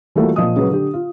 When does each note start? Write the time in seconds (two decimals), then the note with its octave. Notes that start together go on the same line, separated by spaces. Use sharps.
0.15 E3 G3 A3 A#3 F4 F#4
0.36 A#2 F3 D#5 D#6
0.56 C#3 F#3 G#3 B4
0.69 D3 G4
0.94 F4